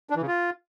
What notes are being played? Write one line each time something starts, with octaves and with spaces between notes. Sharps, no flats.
D4
E3
C#3
F4